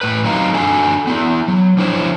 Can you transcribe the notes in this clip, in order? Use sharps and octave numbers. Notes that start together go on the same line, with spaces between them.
A2 B4
F#3 C4 D#4 F5 A#5
D4 F#4 A4 G#5
B3 E4
F#3
F3 D4 E4 C5 C#5